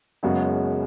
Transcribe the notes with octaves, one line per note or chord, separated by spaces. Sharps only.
F#1 F#2 C#3 G#3 B3 F#4